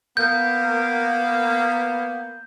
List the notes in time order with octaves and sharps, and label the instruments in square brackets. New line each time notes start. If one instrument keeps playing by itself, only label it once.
[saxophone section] A#3 B3 [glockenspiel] G6